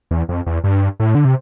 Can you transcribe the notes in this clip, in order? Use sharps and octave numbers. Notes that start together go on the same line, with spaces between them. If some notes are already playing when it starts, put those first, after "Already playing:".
E2
F2
E2
G2
A2
D3
C3